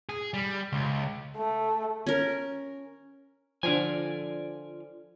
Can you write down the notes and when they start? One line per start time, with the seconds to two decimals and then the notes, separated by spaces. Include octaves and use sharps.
0.09 G#4
0.34 G3
0.73 C#2
1.36 A3
2.07 C#4 A#4
3.63 D3 F3 F4 D5 G#5